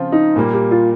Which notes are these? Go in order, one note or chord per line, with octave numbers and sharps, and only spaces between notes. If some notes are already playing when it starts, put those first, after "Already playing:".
Already playing: C#3 F3 C4 F4
D#4
A#2 G3 A#3
G4
F4